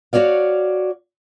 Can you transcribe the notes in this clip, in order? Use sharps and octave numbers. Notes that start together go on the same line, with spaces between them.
F#4 G4 C#5 D5 F5